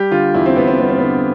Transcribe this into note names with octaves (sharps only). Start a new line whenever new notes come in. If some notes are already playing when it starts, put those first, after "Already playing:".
Already playing: G3 G4
D3 F4
E2 E4
C4
E2 B3
C4
G3 B3
C4
D3 B3